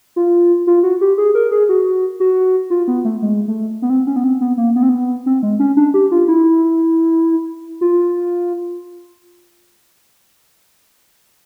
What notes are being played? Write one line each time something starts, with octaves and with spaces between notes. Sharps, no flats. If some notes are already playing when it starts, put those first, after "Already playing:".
F4
F4
F#4
G4
G#4
A#4
G#4
F#4
F#4
F4
B3
A3
G#3
A3
B3
C4
C#4
B3
C4
B3
A#3
B3
C4
B3
C4
G#3
C#4
D4
G4
F4
E4
F4